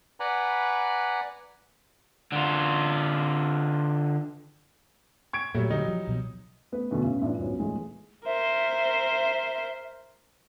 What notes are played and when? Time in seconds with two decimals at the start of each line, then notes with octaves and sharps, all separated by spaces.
0.20 B4 D5 F#5 G#5 A#5 B5
2.32 D3 F4
5.33 C#6 G#6 D7
5.54 A#2 F#3 G3 A3
5.70 D3 F#3 G3 D#4
5.88 F3
6.07 C2 B2 F3
6.72 A3 B3 B4
6.91 E2 B2 D3 A3
7.04 A2 C#3
7.22 A2 E3 D4 F4
7.38 C#2 G#2 F#3 B3 C#4
7.59 E2 A#2 G#3 A3
8.26 A#4 C5 E5